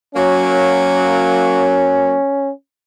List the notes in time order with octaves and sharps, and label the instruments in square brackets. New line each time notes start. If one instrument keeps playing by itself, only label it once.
[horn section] F#3 A#3 [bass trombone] C#4